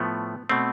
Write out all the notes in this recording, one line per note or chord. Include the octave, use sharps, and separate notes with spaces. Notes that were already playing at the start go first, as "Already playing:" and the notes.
Already playing: A2 F3 A3 B3
B2 A3 C4